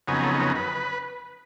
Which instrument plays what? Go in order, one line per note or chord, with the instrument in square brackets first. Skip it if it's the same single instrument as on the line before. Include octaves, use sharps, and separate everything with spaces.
[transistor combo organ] F2 C#3 F#3 B3 D#4 G#4
G#4
A4
A#4
B4